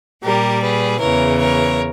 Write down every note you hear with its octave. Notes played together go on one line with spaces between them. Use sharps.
A#2 G3 G4 A#4
G#4 B4
E2 C#3 E3 A#4 C#5
A#4 C#5